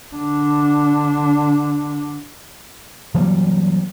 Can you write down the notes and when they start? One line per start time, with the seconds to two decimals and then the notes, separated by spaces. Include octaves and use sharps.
0.15 D3 D4
3.14 E3 F#3 G3 A#3